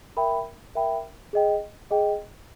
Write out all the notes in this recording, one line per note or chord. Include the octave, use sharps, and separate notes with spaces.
A#4 E5 G5 B5
A#4 E5 G5 B5
G#4 D#5 G5
G#4 D#5 G5